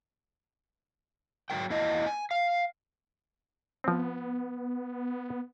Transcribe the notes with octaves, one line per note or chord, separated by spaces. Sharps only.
G#2 F#3 G#3 A#4 G5
E2 A#3 E4 D#5 A5
G#5
F5
F3 B3 C4